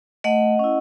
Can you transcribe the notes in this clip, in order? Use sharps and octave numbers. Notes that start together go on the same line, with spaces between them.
A3 D#5 F#5
C#4 E4